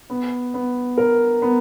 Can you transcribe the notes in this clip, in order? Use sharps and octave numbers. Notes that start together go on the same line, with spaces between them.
B3
B3
A#4
B3